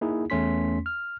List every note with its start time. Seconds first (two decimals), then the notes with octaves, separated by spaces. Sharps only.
0.01 A#3 D#4 E4 G#4
0.30 E2 A3 C#4 C6 B6
0.86 F6